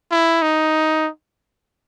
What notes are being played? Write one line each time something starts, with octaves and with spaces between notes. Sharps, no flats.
E4
D#4